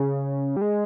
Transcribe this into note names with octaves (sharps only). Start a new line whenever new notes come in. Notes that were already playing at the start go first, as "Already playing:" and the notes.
Already playing: C#3
G3
G#3